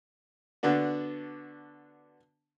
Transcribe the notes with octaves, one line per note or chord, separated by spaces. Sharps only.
D3 B3 D4 F#4